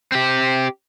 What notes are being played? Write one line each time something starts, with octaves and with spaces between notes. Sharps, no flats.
C4 G4